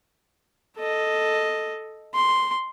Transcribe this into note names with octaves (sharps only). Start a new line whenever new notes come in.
A4 D#5
C6